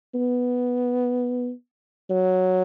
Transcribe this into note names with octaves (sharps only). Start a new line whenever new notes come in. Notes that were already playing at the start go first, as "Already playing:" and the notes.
B3
F#3